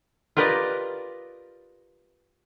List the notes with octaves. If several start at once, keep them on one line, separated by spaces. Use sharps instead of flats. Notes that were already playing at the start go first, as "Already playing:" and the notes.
F4 G4 A#4 B4 D5 D#5